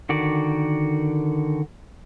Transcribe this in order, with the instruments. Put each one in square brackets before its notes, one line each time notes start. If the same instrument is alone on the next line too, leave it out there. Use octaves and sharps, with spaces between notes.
[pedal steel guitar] D3 D#3 F#4 D5